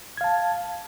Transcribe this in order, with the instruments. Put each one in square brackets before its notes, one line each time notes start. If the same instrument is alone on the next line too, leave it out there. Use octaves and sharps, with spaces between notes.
[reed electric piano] G#6
F5
A5